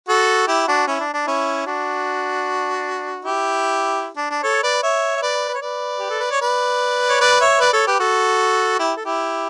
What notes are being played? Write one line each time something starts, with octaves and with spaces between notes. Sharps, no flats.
F#4 A4
E4 G4
D4 F#4
C#4 E4
D4
D4
C#4 E4
D4 F#4
E4 G4
D4
D4
A4 C#5
B4 D5
C#5 E5
E5
B4 D5
B4
C#5
B4 D5
G4
A4
B4
C#5
B4 D5
C#5
B4 D5
C#5 E5
B4 D5
A4 C#5
G4 B4
F#4 A4
E4 G4
A4
E4 G4